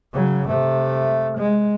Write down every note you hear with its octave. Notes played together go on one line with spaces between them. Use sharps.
C#3 F#3
C3 A3
G#3